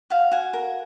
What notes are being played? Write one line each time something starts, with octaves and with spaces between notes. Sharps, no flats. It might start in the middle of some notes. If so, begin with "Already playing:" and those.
F#4 F5
F#4 G#5
A#4